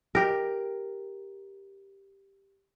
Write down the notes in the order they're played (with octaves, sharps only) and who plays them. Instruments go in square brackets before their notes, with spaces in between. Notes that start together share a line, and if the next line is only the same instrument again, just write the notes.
[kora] G4 A#4